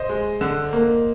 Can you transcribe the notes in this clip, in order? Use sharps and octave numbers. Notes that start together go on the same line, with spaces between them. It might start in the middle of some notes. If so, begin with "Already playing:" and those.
Already playing: C5 D#5
G#3
D3
A#3